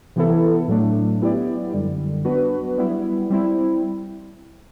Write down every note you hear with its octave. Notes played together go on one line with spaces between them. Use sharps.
C3 E3 B3 E4 A4
A2 F#3 A3 D4
F#3 B3 E4 G4 D5
F#2 D3 G3
F#3 B3 D4 F#4 B4
G3 B3 E4
G3 C4 E4